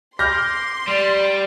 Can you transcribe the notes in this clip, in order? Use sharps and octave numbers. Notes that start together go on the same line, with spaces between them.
C6 D6 F6 G6 A#6
G3 D5